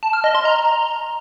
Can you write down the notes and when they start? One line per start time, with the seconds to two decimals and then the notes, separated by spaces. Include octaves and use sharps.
0.03 A5
0.13 F6
0.24 D#5
0.35 C6
0.45 A#5